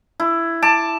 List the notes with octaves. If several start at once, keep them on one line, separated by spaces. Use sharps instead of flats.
E4
A5 D6